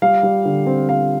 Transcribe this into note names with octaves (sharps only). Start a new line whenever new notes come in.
G3 F5
G3
D3
C4
C4 F5